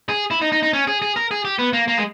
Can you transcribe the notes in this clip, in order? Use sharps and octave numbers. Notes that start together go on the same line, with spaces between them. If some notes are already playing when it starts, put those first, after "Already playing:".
G#4
E4
D#4
D#4
D#4
C#4
G#4
G#4
A#4
G#4
G4
B3
A#3
A#3
G#3